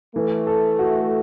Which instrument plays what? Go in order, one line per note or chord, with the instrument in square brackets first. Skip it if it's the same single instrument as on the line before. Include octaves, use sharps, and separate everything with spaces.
[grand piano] E3 [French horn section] A3
[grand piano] A4
F#4